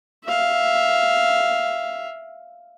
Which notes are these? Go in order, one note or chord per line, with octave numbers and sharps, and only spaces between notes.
E5 F5